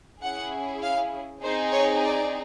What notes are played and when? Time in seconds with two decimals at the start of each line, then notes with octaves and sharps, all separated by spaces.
0.23 C#4 E4 G#4 F#5
0.83 F5
1.43 C4 D#4 G#4 C5
1.73 C#5
2.04 D5